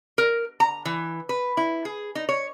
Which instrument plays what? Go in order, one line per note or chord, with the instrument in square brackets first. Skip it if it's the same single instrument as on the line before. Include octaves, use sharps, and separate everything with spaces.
[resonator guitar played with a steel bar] A#4
A#5
E3
B4
E4
G#4
D#4
C#5